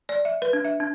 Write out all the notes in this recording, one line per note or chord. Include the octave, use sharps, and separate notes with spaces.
D5
E5
B4
D4
E5
D4